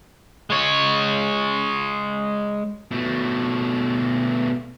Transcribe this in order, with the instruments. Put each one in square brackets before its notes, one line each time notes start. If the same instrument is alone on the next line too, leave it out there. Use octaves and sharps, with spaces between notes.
[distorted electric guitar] G#3 C#5
B2 A3